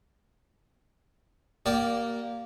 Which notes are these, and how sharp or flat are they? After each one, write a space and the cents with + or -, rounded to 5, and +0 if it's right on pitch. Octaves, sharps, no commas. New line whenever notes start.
A#3 +0 G4 -35 D5 +0